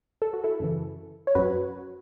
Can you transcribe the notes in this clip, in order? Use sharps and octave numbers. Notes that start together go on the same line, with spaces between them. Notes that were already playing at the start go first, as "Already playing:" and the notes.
A4
F#4
E4 A4
F#2 C#3 E3
C#5
F#2 F#3 F#4 B4